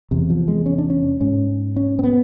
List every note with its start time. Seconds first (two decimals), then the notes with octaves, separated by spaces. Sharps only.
0.11 E2 C3
0.30 F3
0.48 G#3
0.66 C#4
0.78 D4
0.90 C#4
1.21 G#2 C#4
1.76 C#4
1.99 C4
2.03 B3